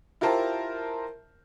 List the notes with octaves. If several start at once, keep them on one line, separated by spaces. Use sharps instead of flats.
E4 F4 G4 A#4 C5 A5